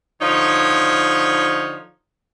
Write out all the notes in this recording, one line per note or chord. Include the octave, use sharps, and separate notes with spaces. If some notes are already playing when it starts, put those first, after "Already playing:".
D3 F3 D#4 C#5